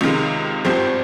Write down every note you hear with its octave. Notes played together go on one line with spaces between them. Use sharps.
C#2 C3 D#3 G#3
G#1 G2 F3 C4 G4